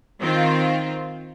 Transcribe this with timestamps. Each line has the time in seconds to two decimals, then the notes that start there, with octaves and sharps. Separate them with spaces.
0.21 D#3 C4 F4